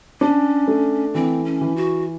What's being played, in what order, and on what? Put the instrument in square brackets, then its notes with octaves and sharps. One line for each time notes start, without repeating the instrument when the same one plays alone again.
[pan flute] C#4 [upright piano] D4
[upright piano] A3
[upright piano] E3 [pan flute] C4
[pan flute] C#4
[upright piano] E3
[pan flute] F#4